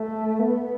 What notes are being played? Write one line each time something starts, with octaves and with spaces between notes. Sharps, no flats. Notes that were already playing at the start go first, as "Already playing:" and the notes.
Already playing: A3
B3